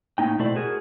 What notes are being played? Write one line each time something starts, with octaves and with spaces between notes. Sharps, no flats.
A2 A#3 D#4 G5
B2 A3 E4 A4 C5 D5
F#4 G#4 A#4